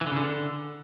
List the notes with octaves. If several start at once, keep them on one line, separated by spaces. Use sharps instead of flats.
E3
D3
C#3
D3